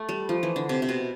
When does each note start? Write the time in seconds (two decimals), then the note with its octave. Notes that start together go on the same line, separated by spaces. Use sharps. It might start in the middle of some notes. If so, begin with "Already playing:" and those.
Already playing: A3
0.09 G3
0.29 F3
0.43 E3
0.56 D3
0.69 C3
0.82 C3
0.89 B2